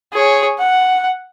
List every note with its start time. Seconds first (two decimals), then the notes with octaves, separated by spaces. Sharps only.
0.13 G#4 C#5
0.59 F#5